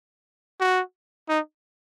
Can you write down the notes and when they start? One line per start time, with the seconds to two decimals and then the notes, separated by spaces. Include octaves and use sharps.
0.60 F#4
1.29 D#4